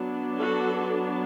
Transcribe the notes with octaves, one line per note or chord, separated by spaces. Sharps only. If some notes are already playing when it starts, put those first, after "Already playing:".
Already playing: F#3 B3 D4
F#4 A4